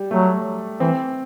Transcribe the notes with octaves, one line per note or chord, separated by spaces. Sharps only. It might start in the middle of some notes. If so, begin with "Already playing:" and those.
Already playing: G3
F#3 A3
E3 C4